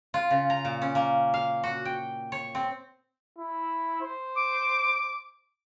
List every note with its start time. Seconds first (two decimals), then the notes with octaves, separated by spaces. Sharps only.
0.14 F4
0.31 C#3
0.50 A#5
0.65 A#2
0.82 C#4
0.95 A#3
1.34 F5
1.64 F#4
1.85 G5
2.32 C#5
2.55 C4
3.38 E4
4.01 C5
4.36 D6